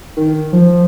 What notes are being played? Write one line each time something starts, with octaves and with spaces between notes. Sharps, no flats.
D#3
F3